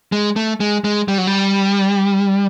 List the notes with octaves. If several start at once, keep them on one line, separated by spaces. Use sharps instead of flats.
G#3
A3
G#3
G#3
G3
F#3
G3